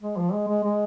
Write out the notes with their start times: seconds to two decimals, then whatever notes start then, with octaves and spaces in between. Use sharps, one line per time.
0.02 G#3
0.17 F3
0.33 G#3
0.48 G#3
0.64 G#3